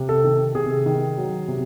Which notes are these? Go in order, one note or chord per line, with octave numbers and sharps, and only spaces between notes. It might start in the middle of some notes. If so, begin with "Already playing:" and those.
Already playing: C3
A4
D#3
C3 G#4
D#3
F#3
C3